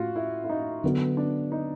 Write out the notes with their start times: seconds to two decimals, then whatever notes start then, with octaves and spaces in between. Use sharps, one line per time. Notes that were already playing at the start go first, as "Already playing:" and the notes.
Already playing: A2 F4 F#4
0.16 E4
0.44 E4
0.49 D#4
0.84 D3 F#3 B3
1.17 D4
1.52 D#4